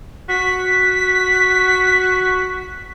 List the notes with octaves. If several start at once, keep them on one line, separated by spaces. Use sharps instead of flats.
F#4 B6